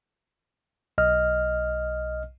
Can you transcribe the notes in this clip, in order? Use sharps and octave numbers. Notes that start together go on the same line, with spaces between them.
B1 D#5 F6